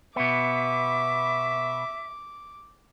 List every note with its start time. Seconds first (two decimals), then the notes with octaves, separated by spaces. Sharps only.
0.16 B2 B3 E5 D6